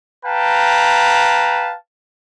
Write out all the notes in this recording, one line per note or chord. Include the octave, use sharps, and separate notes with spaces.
B4 F5 G5 A5 A#5